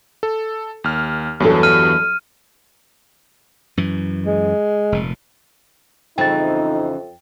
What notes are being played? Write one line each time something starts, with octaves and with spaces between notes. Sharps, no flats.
A4
D#2 F6
E2 G2 F#3 A4
F6 D#7
F#2 E3
G#3
F1 A#2
F2 C#3 E3 C4 D#4 G5 A6